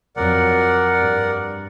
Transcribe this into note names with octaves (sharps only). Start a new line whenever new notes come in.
F2 F#3 A#4 D5 F#5
G2